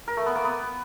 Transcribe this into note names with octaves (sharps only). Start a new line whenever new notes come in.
A#4
A3
B3
A#3
B3